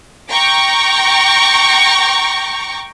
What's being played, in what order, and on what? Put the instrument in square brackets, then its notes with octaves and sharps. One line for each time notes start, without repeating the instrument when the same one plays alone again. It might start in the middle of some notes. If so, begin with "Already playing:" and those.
[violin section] G5 A#5 C#6 D6